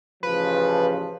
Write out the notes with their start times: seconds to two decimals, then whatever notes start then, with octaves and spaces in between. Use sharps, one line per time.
0.23 A1 C#3 F3 B4